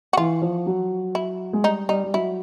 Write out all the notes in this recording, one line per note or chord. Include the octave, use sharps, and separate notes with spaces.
F#4
E3 F4
F3
F#3
E4
G#3
G3 D#4
G3 D#4
G3
F#3 E4